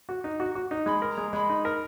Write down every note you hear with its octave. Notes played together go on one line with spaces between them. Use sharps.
F#4
D#4
F#4
F#4
D#4
G#3 B5
A#4
A#5
G#3
G#3 B5
D#4
A#4